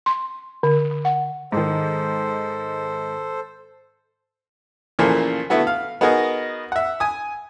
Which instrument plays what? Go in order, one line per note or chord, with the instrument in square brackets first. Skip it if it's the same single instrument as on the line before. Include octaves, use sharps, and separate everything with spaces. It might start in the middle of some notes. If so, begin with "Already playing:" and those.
[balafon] C6
D3
F#5
[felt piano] G#2 D#3 [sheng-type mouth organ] A4 C5
[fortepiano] A#2 C#3 E3 F3 A3 A#3
D3 A3 B3 E4 F#4
F5
B3 D#4 F#4 G#4 A#4 D#5
E5 F#5
G#5 D#6